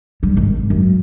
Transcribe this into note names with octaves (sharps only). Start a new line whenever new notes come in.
G3
G#1
F#2